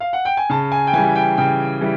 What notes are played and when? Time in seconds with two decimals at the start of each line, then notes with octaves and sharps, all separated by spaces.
0.00 F5
0.13 F#5
0.25 G5
0.37 G#5
0.50 C#3 A5
0.72 G#5
0.87 G5
0.93 E3 G#5
0.98 G3
1.15 G5
1.37 C#3 G5
1.81 E3 G3